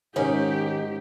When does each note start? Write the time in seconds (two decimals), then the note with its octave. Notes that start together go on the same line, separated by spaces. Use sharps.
0.16 G#2 D#3 C#4 D#4 G4